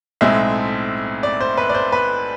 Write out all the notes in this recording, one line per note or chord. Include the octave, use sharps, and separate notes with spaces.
B1 A2 G#3 C4 E5
D5
C5
B4
D5
C5
B4